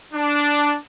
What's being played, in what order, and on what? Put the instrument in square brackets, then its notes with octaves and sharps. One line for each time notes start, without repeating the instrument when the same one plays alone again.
[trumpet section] D4